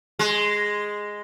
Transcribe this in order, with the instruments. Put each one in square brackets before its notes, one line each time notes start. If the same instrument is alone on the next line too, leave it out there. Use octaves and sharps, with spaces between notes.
[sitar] G#3